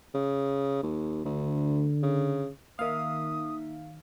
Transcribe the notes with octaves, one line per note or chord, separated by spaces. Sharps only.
C#3
D#2
D2 D3
C#3
D#3 A#3 D#4 E5 F5 D#6